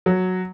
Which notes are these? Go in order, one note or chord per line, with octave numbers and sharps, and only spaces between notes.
F#3